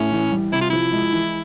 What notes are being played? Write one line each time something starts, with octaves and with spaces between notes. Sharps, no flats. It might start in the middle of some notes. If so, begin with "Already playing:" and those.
Already playing: A2 C#4
E3
G3
C3 E4
F4
F3 E4
G#3
E3